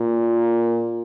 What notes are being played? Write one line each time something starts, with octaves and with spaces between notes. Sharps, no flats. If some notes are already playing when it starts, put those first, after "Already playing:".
Already playing: A#2